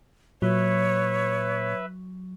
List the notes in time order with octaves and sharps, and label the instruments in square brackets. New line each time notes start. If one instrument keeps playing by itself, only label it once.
[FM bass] A#2 [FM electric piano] F#3 [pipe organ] B4 E5 [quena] C#5